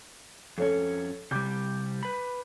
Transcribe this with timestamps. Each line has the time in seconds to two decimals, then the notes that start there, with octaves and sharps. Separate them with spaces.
0.58 F2 C#4 A4 C#5
1.31 C3 G3 D6 G6
2.03 B4 B5